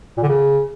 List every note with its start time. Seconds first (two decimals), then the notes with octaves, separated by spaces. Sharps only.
0.17 A#2
0.23 D3
0.28 C#3